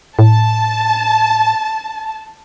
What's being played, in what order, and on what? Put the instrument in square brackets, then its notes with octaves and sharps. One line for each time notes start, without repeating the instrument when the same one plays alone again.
[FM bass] A2 [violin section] A5